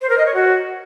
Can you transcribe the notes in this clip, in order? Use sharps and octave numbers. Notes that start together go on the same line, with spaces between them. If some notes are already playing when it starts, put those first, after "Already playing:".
C5
A#4
D#5
C#5
F#4